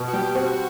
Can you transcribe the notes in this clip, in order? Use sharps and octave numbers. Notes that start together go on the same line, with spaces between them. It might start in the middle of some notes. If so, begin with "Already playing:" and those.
Already playing: B2
F#4
G3 G4
C4 F#4